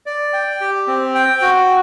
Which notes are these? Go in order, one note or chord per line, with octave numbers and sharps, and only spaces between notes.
D5
G5
G4
C4
G5
F#4